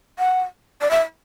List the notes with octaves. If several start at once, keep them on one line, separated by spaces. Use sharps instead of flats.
F#5
D5
E5